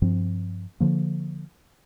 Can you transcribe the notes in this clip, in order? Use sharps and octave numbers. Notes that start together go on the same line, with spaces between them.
G2 F3 C4
D3 F3 A#3